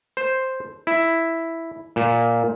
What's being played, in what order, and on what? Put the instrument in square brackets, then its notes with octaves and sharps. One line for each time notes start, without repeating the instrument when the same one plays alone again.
[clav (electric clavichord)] C5
E4
A#2